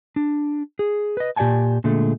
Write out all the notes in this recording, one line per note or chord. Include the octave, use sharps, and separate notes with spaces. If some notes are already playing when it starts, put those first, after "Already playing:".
D4
G#4
B4 D#5
A#2 G4 D5 F#5 G#5 A5
A#2 D3 G#3 A3